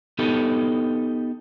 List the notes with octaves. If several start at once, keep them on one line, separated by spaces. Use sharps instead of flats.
B3 D#4 G4 A4